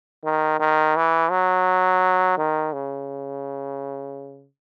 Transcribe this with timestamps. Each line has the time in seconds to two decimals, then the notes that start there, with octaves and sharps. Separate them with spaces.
0.24 D#3
0.60 D#3
0.96 E3
1.31 F#3
2.37 D#3
2.73 C#3